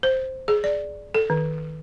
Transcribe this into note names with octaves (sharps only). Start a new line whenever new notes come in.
C5
G#4
D5
A4
D#3